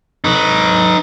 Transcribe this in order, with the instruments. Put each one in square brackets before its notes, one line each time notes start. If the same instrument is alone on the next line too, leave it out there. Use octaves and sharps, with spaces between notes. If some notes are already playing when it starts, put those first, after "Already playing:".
[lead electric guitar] D#4 B4